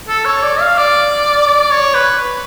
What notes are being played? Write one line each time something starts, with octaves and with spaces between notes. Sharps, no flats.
A4
C#5
D5
F5
D5
D5
C#5
B4